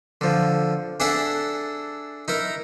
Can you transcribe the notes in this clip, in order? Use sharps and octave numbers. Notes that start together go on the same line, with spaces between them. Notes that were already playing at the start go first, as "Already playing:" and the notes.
D3 F3
D4 G#4 A4 E5 F#5
D#4 E4 A#4